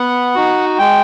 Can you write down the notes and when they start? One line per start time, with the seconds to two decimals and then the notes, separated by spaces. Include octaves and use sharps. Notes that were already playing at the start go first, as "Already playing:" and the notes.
Already playing: B3 F#5
0.35 D#4 F#4
0.79 G#3 G5